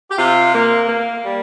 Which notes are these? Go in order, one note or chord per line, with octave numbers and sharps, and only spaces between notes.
G4
C3 F4
A#3
A#3
G3